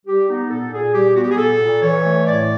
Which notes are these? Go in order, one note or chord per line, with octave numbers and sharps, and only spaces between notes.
G3 G4
B3 D#4
A#2 A4
A#2 G#4
G3 G4
B3 F#4
G4
G#4
A#2 A4
A#2
E3 C#5
A3
A2 D5